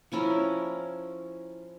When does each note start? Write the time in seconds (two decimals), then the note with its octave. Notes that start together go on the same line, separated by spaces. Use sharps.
0.12 F3 C#4 E4 A#4